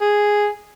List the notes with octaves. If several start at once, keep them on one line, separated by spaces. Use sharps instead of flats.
G#4